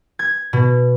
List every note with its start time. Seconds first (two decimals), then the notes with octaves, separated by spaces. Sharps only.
0.19 G#6
0.53 B2